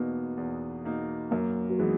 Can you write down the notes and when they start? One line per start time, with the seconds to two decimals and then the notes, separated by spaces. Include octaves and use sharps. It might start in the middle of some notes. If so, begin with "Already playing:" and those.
Already playing: E2 B2 A#3 B3 D#4
0.37 E2
0.84 B2 A#3 D#4
1.31 F#2 A#3
1.70 F#3
1.79 E3 G#3 B3 D#4